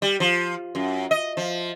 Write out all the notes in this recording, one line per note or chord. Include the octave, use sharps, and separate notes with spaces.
G3
F3
F#2
D#5
F3